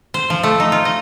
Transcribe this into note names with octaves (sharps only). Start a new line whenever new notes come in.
C5
F3
A3
D#4
F4
D#5